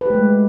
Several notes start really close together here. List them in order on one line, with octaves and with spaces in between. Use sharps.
B4 G4 A3 G#3